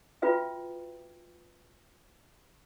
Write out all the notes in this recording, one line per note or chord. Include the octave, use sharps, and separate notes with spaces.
F4 F#4 B4 E5 G5